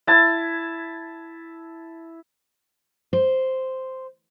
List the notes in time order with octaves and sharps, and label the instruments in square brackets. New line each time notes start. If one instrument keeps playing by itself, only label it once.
[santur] E4 A5
[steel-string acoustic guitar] C5